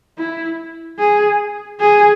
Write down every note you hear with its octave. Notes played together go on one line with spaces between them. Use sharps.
E4
G#4
G#4